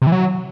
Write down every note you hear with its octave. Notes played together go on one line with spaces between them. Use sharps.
C3
E3
F#3